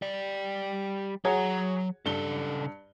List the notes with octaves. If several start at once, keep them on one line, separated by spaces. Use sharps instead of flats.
G3 D5
F#3 F#4 G#4 C#5 A#5
G2 C#3 A4 G7